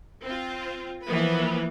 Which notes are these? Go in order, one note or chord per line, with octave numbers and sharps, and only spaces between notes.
C4 F4
E3 F3 A#3 B3 B4